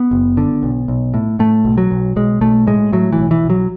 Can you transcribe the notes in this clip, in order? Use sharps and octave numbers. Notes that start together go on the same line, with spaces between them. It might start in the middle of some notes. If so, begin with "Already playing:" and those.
Already playing: B3
F#1
D3
B1
B1
A2
A2 A3
B1
F#3
B1
B1 G#3
B1 A3
A2 G#3
A2 F#3
E3
B1
E3
B1
F#3